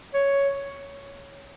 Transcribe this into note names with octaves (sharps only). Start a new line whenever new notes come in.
C#5